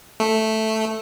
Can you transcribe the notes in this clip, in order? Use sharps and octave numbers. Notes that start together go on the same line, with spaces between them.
A3